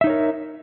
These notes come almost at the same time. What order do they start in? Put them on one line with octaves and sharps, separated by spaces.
E5 D#4 C#5 A#4